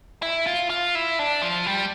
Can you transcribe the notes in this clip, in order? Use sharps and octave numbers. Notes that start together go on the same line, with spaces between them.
E4
F4
F4
E4
D4
F3
G3